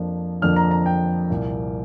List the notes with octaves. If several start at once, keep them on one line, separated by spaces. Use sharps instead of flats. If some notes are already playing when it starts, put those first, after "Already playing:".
Already playing: F2 F3 A#3 D4
F2 D3 F3 A#3 D4 F6
A#5
A#5
G5
C2 A#2 A#3